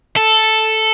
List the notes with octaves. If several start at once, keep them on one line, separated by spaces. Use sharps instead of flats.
A4